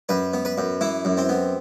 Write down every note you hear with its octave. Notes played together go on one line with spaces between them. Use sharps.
F#2 B4
B3
B4
F#2
E3 E4
F#2
C4
B3